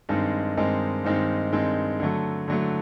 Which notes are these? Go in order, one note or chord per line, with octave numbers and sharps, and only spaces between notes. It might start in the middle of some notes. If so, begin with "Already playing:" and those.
G2 D#3 G#3 C4 D#4
G2 D#3 G#3 C4 D#4
G2 D#3 G#3 C4 D#4
G2 D#3 G#3 C4 D#4
D3 F#3 A3
D3 F#3 A3